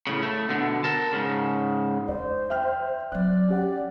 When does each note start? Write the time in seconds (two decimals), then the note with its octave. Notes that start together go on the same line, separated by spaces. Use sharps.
0.07 A2 C#3
0.23 A3
0.49 B2 D3
0.84 A#4 A5
1.13 G#2 C#3
2.08 E2 C5 D5
2.50 E5 G5 F6
3.12 F#3 C4 D5 F#6
3.48 C#4 G4 F#5